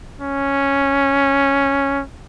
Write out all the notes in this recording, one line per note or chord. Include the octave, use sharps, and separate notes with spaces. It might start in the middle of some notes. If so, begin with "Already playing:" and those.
C#4